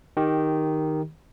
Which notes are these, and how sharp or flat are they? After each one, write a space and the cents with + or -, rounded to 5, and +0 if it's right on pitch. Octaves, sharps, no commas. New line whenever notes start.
D#3 +0 G4 +0